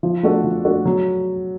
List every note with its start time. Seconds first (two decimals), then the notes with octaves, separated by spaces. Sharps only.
0.03 F3
0.23 A3 D4 F#4 A4
0.44 F3
0.64 A3 D4 F#4 A4
0.85 F#3